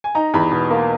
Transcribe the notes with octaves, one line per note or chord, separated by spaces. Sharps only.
G#5
D#4 A#5
E2 B5
B2
A#3